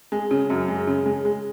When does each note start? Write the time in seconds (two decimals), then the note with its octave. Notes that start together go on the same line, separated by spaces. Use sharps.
0.12 G#3
0.31 C#3
0.50 F#2
0.68 G#3
0.87 C#3
1.06 G#3
1.25 G#3